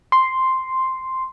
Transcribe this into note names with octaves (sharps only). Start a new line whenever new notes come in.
C6